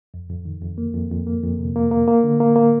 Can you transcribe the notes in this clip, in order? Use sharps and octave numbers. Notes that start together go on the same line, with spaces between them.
F2
F2
D#3
F2
A#3
F2
F2
A#3
F2
C3
A#3
A#3
A#3
D3
A#3
A#3